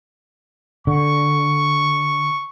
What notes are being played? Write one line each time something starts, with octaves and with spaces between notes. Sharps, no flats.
D3 C#6